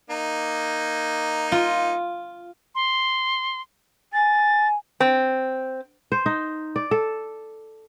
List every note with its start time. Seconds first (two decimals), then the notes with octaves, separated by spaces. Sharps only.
0.10 A#3 D#4
1.52 F4
2.75 C6
4.13 G#5 A6
5.00 C4
6.12 C5
6.26 D#4
6.76 D5
6.91 A4